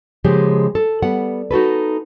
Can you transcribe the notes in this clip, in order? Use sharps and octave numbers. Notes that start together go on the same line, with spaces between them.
C#3 F3 G#3 A#3 G4 G#4
A4
G3 B3 F#5
D#4 F#4 A4 B4